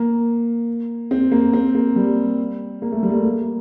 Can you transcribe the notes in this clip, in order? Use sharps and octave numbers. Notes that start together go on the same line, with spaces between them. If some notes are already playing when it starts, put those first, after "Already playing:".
Already playing: A#3
C4
A#3
C4
A#3
G3
A#3
A3
G3
A#3
A3
A#3